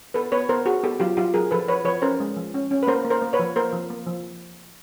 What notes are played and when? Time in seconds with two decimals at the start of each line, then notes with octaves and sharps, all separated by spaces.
0.14 B3 A4 B4
0.32 B3 B4 C#5
0.49 B3 A#4 C5
0.66 B3 F#4 G#4
0.83 B3 G4 A4
1.00 F#3 F4 G4
1.17 F#3 F4 G4
1.34 F#3 G#4 A#4
1.51 F3 A4 B4
1.68 F3 B4 C#5
1.85 F3 B4 C#5
2.02 C#4 A#4 C5
2.20 G#3
2.37 F3
2.54 C#4
2.71 C#4
2.83 B4
2.87 A#3 A#4 C5
3.05 A#3
3.10 A#4 C5
3.22 A#3
3.33 B4 C#5
3.39 F3
3.56 A#3 A#4 C5
3.73 F3
3.90 A#3
4.07 F3